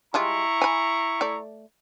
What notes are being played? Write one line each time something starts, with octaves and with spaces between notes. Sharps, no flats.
G3 G#3 E4 F4 A#5 C#6
G#5 B5
A3 D5